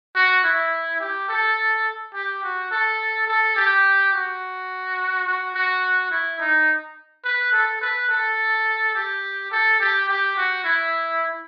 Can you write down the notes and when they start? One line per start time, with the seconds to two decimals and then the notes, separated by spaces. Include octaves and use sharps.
0.15 F#4
0.44 E4
1.00 G4
1.29 A4
2.14 G4
2.43 F#4
2.71 A4
3.27 A4
3.56 G4
4.13 F#4
5.26 F#4
5.54 F#4
6.11 E4
6.40 D#4
7.24 B4
7.53 A4
7.81 B4
8.09 A4
8.95 G4
9.52 A4
9.80 G4
10.09 G4
10.37 F#4
10.65 E4